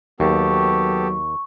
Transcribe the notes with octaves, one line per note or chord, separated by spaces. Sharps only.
D#2 F#3 B3 G4 A4 C#6